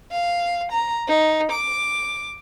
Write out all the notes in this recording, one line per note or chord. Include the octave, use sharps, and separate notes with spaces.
F5
A#5
D#4
D6